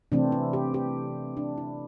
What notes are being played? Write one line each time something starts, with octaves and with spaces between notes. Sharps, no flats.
C3 E3 A3 C4 D4
E4
G4
G4
D4
E4